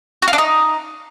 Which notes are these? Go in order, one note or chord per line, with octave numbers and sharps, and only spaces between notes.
F#4
F4
D4
D#4